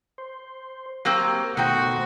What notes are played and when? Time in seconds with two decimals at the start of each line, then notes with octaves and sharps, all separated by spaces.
0.18 C5
1.05 F#3 A#3 C4 G4 A#4
1.57 B2 D#3 A3 F#4 C5 G5